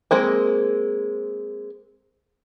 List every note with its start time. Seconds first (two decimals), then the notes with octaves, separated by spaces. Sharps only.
0.11 G#3 A#3 C4